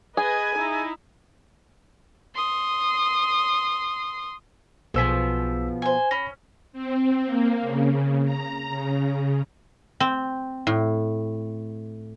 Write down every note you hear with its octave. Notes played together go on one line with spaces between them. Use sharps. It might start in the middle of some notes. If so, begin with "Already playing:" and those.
G#4 B4 D#5 G#5 G#6
D#4 E4
C6 D#6
B1 B2 F3 G#4 C5 E6 B6
C5 G#5
C#4 B5 A#6
C4
A#3
C#3
A#5
C#3
C4
A2